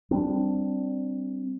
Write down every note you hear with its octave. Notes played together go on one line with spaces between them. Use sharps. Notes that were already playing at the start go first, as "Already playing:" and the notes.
G3 B3 C4 D4